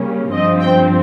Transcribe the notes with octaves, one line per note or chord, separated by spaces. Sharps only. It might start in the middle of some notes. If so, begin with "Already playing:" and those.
Already playing: C#3 G3 A#3 C#4
G2 F3 C4 D#5
G5